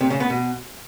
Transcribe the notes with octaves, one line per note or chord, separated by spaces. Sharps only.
C3
C#3
B3
B2